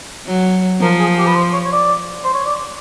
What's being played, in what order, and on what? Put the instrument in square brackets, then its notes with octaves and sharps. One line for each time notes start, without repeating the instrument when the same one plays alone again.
[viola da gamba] F#3
[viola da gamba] F3 [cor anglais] A#4
[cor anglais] G#4
G4
B4
C5
C#5
C#5
D5
C5
C#5
D5